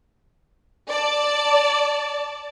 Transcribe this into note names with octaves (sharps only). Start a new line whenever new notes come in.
D5 A5